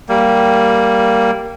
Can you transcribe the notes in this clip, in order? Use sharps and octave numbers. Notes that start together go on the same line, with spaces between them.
G3 A#3